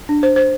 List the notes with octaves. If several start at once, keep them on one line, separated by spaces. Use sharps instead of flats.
D4
C5
C5